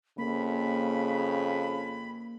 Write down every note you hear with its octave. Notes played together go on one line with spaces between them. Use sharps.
F2 C#3 A#3 B5